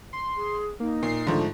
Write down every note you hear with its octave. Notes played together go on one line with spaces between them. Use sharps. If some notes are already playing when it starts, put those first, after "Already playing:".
C6
G#4
A#3 D#4
A#2 C7
G#2 D3 F3 A3